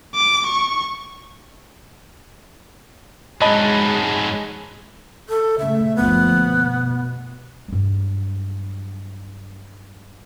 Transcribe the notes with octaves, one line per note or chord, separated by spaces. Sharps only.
D6
C#6
G#2 F#3 G#3 G#4 D#5 A5 B5
A4
C#3 A3 E5
F#1 D2 F3 B3
B2
G2 F#3